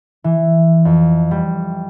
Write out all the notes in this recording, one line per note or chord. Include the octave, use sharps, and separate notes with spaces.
E3
F2
G3